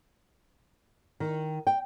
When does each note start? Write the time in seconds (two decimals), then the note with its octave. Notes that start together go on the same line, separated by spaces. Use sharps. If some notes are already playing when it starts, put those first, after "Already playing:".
1.20 D#3
1.67 G5